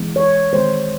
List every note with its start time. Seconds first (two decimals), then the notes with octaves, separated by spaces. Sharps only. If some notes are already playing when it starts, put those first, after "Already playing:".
Already playing: E3 G#3 B3
0.16 C#5
0.53 D#3 G#3 B3 C5